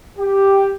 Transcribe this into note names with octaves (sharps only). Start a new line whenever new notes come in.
G4